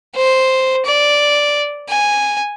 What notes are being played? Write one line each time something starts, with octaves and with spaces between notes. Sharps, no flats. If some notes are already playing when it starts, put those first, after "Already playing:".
C5
D5
G#5